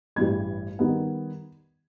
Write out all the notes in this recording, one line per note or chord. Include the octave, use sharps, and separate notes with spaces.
A1 G2 E3 G3 G#6
D#3 G3 B3